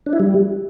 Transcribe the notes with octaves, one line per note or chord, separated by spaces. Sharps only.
D4
E4
G3